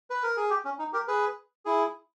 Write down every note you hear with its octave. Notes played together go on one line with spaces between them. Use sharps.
B4
A#4
G#4
G4
C#4
D#4
G4 A#4
G#4 B4
E4 G#4